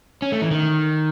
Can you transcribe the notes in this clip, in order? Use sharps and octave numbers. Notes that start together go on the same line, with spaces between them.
C#4
A3
E3
D#3